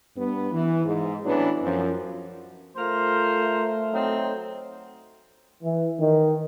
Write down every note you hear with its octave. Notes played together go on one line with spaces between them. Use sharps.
G2 B3
E3
G#2
A2 E3 F#3 B3 C#4 D4
F#2 F3
A3 F4 A#4 C5
F#3 C4 D#4
E3
D#3